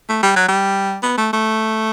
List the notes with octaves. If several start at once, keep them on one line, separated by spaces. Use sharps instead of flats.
A3
G3
F#3
G3
B3
A3
A3